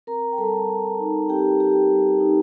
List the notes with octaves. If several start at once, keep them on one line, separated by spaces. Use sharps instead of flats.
C4 A#4 A#5
G5
G3 A4 A5
G3
D#4
C4 G4 G5
G3 G4 G5
G3
D#4